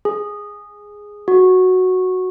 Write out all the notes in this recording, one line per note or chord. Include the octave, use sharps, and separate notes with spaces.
G#4
F#4